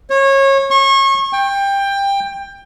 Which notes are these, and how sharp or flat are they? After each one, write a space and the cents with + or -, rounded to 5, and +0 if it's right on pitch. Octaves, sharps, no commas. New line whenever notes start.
C#5 -25
C#6 -30
G5 +20